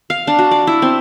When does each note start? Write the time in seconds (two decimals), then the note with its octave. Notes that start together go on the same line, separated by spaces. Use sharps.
0.10 F5
0.27 D4
0.39 F#4
0.51 D5
0.67 E4
0.82 C4